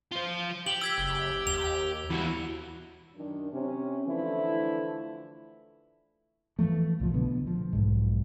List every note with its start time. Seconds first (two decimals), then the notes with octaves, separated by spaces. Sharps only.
0.12 F4 C5
0.66 G4 F#7
0.81 E6 G#6 B6
0.98 F#1
1.47 D#2 F7
2.10 E2 E4 F#4
3.16 F#2 D#3 D4
3.52 C3 C#4
4.05 D3 E3 F3 A3 E4
6.59 E3 F3 A3
7.00 C2 A#2 F3
7.14 B2 D3 B3
7.47 F3
7.73 B1 G#2